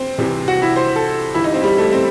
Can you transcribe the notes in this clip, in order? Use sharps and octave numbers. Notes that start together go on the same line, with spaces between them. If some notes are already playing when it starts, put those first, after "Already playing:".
Already playing: C4
C2 C3 E3
F#4
E4
C5
A4
G1 G2 E3 E4
D#4
C4
G3
A3
C4